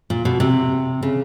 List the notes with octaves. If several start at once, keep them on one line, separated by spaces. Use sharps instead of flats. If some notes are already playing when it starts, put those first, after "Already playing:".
A#2
B2
C3
C#3